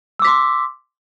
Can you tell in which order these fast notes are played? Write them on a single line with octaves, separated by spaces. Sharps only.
E6 D6 B6 C6